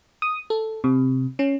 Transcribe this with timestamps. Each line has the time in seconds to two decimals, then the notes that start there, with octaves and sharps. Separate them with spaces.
0.22 D#6
0.50 A4
0.84 C3
1.39 C#4